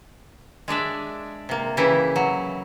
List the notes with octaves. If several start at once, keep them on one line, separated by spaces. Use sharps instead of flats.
G#3 D4 D5 E5
C3 A#3
C#3 E3 E4 G4
F#3